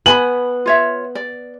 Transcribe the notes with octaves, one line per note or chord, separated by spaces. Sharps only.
B3 G#5 A#5 B5 F#7
F4 C#5 E5
D5